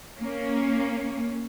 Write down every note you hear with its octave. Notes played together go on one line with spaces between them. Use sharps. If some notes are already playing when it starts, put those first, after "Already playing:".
A#3 C#4